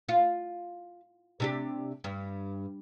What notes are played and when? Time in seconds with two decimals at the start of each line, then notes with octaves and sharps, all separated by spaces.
0.09 F4
1.40 C3 D4 G4
2.04 G2